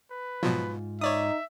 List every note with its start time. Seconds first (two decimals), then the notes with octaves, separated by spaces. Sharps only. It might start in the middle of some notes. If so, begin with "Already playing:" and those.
0.11 B4
0.43 G#2 B2 F3 F#3 F4
1.01 D#4 C#5 D5 E5 D#6